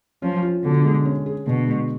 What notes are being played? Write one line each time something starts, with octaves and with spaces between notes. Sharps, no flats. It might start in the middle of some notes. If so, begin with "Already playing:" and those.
F3 C#4
F4
B2 D3
G#3
C#4
G#4
B2 D3
G#3